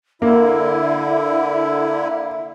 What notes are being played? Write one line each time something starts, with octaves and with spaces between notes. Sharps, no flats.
D3 A#3 E4 E5